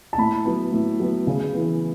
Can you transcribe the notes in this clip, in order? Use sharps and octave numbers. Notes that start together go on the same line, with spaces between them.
A5
A2 B5
F#3 B3
A2
F#3 B3
C#3
E3 B3